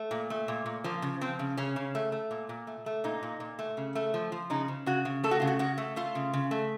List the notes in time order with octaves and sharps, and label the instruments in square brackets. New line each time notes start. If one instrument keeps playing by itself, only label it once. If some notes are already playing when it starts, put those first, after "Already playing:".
Already playing: [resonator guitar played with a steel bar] A3
A#2
A3
A#2
A#2
F3 A#3
C#3
F3 C4
C#3
C#3 C#4
C#3
A3
A3
A#2
A#2
A3
A3
A#2 D#4
A#2
A#2
A3
C#3
A3
F3
F3
C#3 D#4
C#3
C#3 F#4
C#3
A3 A4
F#4
C#3 F4
F#4
C#3 F#4
A3
A3 F4
C#3
C#3
A3